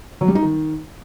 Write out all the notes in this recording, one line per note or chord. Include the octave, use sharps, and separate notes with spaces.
F#3
G3
D#4
D#3